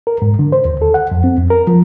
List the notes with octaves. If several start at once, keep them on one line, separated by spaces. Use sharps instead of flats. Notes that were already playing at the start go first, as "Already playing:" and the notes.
A#4
G#2
D3
C5
D#2
A4
F#5
F2
C4
F2
A#4
F3